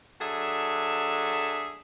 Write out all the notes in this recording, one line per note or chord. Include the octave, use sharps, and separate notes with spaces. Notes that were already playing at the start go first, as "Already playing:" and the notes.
F#3 D4 G#4 A4 E5